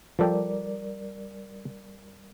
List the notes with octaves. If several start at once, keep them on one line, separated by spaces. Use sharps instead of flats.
F3 G3 A4 A#4 D5 G5